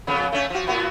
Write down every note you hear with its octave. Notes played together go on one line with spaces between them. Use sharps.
F2 C#3 B3
A3 C#4
F3 F#4
A2 B3 F#4